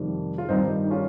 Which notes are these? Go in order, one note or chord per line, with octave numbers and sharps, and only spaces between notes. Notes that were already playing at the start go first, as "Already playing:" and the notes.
Already playing: F2 C3 D#3 G3
F4
G2 D#3 G3 C4 D#4
D#4
C#4 F4